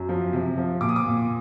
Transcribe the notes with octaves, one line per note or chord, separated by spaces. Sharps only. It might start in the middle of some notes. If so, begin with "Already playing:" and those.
Already playing: F#2
F3
C3
F3
A#2 D6
D#6
D6
A#2